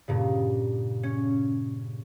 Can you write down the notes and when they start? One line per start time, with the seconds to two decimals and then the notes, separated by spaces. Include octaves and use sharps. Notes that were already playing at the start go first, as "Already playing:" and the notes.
0.08 G2 A#2 C#3
1.03 C#4